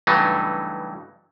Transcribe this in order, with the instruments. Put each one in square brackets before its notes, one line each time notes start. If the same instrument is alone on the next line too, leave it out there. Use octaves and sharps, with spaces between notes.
[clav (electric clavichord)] G2 C#3 E3 F#3 A3 D#4